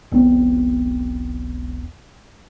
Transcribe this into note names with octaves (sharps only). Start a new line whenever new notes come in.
E1 B1 B3 C4